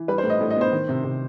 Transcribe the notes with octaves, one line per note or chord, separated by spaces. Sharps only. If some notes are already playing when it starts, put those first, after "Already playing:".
Already playing: E3
G3 B4
C5
A2
D#5
A2
D#5
B3 C5
D#3
C3
C3